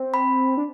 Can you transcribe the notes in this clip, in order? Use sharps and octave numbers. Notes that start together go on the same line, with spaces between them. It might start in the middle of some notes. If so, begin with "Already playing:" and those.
Already playing: C4
B5
D4